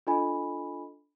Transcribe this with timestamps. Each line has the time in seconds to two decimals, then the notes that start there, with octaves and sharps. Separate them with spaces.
0.07 D4 F4 A4 D#5 G#5 B5